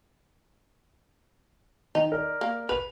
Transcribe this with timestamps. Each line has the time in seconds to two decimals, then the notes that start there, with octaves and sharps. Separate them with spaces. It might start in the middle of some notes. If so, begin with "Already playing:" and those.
1.95 D#3 D#4
2.12 A#4 D5
2.41 A#3
2.69 B4 F7